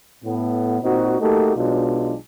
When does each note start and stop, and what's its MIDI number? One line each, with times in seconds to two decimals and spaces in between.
0.25 0.78 45
0.25 0.78 59
0.83 1.19 46
0.83 1.19 60
0.83 1.19 63
0.83 1.19 66
1.20 1.52 57
1.20 1.52 58
1.20 1.52 63
1.20 1.52 66
1.20 1.52 67
1.20 1.52 69
1.56 2.14 35
1.56 2.14 47
1.56 2.14 54
1.56 2.14 56
1.56 2.14 62
1.56 2.14 65